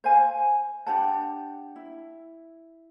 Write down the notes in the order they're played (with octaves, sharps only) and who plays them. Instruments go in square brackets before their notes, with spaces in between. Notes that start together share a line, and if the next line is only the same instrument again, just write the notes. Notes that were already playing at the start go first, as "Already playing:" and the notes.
[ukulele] C5 F5 G#5
D4 G4 F#5 A5
E4